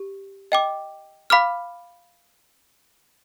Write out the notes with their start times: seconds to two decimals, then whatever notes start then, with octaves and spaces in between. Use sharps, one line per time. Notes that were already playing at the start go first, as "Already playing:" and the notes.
Already playing: G4
0.52 D#5 G5 D6
1.30 F5 B5 D6 F6